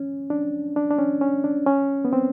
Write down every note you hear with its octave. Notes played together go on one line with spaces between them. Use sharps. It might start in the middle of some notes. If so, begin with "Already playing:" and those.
Already playing: C#4
D4
D4
D4
C#4
C#4
D4
C#4
B3
C4